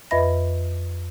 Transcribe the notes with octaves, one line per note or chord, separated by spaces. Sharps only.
F2 B4 D#5 E5 B5 A#6